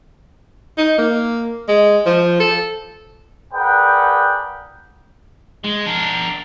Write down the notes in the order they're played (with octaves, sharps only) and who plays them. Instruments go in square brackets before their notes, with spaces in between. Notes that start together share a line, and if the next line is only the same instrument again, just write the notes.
[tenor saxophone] D#4
A#3
G#3
F3
A4
[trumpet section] G#4 A#4 B4 D5 F#5 G5
[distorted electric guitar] G#3
D4 A#4